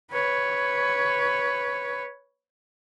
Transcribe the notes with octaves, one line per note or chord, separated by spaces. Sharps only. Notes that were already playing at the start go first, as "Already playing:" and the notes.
B4 C#5